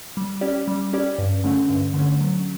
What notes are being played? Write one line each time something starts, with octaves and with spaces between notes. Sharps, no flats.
G3
C#4 G4 D5
G3
C#4 G4 D5
G2
D3 A3 C#4
G2
D3 A3 C#4
F#3